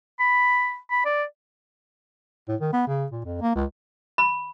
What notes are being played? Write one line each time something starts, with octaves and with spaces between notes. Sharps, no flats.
B5
B5
D5
A2
D#3
B3
C#3
A#2
F2
A#3
C#2
B5